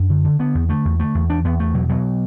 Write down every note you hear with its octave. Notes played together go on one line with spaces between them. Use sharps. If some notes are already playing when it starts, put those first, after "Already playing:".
Already playing: F#2 D4
D3
D3
D3 B3
E2
D3 A3
E2
D3 A3
E2
E2 D4
E2 B3
E2 A3
B2 F#3
B2 F#3